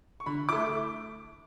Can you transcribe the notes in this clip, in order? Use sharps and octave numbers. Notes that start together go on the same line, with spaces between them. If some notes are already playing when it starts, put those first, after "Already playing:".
C#6
D3 B5
A3 E4 D6